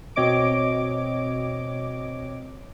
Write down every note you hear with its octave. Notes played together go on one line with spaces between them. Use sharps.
B2 C4 C#5 D#5 D6 D7